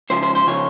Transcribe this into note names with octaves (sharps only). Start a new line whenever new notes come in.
C#2 C#3 F3 C5
C5
C5
C#3 F3 C#5